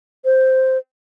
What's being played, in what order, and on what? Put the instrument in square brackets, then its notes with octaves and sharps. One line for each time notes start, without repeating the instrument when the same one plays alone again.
[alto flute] C5